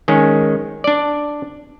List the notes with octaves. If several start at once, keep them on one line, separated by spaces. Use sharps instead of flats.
D#3 G#3 C#4
D4 D5